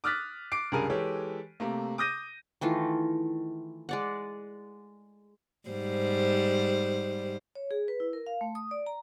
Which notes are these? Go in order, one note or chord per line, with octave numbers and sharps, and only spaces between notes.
D6 D#6 F6 F#6 A6 B6
D6 C7 D7
C#2 G2 G#4 A#4 D#7
E3 G#3 G4 A4 C#5
C3 A3 A#3
D6 D#6 G6 A#6 D#7
D#3 E3 A3 F4
G#3 D5 F#5
G#2 G3 C5
C#5
G#4
B4
E4
A#4
F5
A3
D#6
D5
A#5